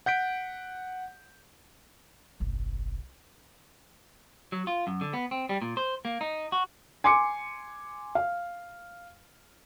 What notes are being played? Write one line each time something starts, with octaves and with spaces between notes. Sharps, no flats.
F#5 G6 B6 D7
F#1 B1
F#3
F4
F#2
D3
B3
C4
G3
A#2
C5
A#3
D#4
F#4
G#5 C6 D6 C#7
F5